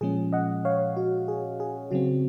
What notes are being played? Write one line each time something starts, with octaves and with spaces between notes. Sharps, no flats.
A#2 F3 G#3 C#4 G#4
D#5 F#5
C#5 F5
F#4
G#4
G#4
C#3 F#3 C4 F#4